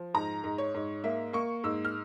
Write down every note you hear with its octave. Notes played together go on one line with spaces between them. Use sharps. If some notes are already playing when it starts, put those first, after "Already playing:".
Already playing: F3
G#2 A#5
G#2
C#5
G#2
A#3 E5
A#3 C#6
G#2 E6
F6